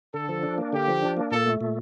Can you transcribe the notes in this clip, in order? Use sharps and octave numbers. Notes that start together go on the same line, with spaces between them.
D3 A4
F3
D4
A#3
D3 G4
F3
D4
A#3
A#2 A4
A3
A#2